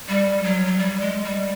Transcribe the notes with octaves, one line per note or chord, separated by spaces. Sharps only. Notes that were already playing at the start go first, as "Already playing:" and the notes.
G3
F#3
F#3
G3
G#3
G3